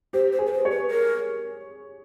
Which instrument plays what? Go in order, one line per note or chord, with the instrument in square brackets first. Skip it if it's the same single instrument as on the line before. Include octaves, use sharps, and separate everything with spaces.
[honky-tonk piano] G4 [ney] C5
[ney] C5
[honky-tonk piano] G#4
[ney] B4
C5
[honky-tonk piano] C#5
[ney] B4
A#4